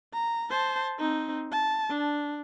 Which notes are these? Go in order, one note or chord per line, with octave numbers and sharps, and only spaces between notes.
A#5
C5 A5
C4 D#4
A5
D4